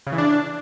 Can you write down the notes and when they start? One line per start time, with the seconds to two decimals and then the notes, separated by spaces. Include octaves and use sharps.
0.07 C#3
0.12 E3
0.18 D4